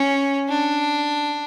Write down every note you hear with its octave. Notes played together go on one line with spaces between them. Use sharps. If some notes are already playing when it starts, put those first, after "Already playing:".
Already playing: C#4
D4